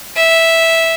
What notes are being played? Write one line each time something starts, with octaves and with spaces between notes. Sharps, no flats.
E5